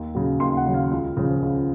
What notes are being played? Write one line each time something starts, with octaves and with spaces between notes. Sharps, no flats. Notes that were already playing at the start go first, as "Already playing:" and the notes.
Already playing: D#2
C#3 F#3
D#2 C6
F#5
C#3 F#3
F5
C#2
C#3 F3
C#2